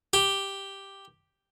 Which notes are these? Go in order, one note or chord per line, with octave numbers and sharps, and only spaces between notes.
G4